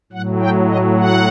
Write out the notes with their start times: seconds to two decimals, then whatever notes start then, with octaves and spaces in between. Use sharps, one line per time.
0.12 A2 F#3 F#5
0.41 G5
0.69 D#5
0.97 F#5